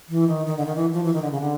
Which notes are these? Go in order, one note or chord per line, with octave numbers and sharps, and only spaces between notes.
E3
D#3
D#3
D3
D#3
E3
F3
E3
D#3
D3
C#3
D3